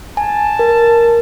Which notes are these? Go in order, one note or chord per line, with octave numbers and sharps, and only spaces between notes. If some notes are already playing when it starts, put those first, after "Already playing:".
G#5 A5
A#4